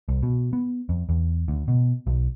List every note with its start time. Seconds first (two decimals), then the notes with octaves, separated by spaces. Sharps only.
0.09 C2
0.23 B2
0.53 B3
0.89 F2
1.09 E2
1.48 D2
1.68 B2
2.07 B1